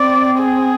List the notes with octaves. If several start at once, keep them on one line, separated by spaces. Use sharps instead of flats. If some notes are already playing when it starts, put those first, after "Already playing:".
Already playing: C4 D5
G#4